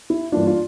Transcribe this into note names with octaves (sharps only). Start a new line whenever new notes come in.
E4
G2 E3 A#3 D4 F4
D4 F4